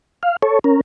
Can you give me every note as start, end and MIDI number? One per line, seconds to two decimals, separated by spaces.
0.23 0.37 77
0.43 0.59 69
0.43 0.59 73
0.64 0.81 61
0.64 0.81 70